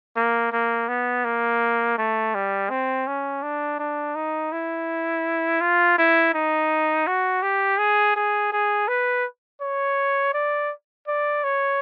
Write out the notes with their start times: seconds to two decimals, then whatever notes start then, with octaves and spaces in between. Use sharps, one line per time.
0.17 A#3
0.53 A#3
0.88 B3
1.25 A#3
1.98 A3
2.35 G3
2.70 C4
3.07 C#4
3.43 D4
3.79 D4
4.16 D#4
4.52 E4
5.61 F4
5.98 E4
6.34 D#4
7.07 F#4
7.43 G4
7.79 G#4
8.16 G#4
8.52 G#4
8.88 B4
9.61 C#5
10.34 D5
11.07 D5
11.44 C#5